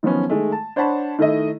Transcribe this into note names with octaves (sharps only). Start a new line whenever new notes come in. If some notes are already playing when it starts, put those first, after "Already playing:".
D#3 F3 F#3 B3 C#4
D#3 G#3 A3
A5
D4 C5 C#5 F#5 A5 B5
D#3 A3 E4 D#5